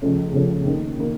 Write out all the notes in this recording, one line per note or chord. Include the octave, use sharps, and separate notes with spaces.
C#2 C#3 F3 A3 C#4
C#2 C#3 F3 A3 C#4
F#2 D#3 A#3
D#3 A#3